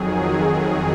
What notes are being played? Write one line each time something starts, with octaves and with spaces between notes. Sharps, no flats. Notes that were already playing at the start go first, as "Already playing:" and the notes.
Already playing: F2 D#3 F#3 G#4